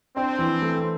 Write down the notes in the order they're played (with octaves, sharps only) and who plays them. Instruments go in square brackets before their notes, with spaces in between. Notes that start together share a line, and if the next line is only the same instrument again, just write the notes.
[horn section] C4 [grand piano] D4
[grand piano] E3
A3